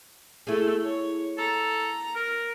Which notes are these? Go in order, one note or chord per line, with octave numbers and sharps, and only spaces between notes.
A3 E4 G#4 A4
C#5
A4 A#5
A#4